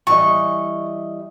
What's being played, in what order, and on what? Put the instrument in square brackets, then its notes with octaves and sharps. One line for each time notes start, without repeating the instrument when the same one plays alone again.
[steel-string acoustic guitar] E3 G3 D#5 [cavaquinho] C#6